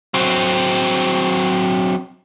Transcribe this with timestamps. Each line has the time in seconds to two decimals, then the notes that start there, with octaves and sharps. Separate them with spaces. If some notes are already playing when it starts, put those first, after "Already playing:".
0.14 F#3 C4